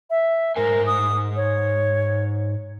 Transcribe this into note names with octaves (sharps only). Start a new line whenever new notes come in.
E5
G#2 A#4 C5 G#5
D#6
C#5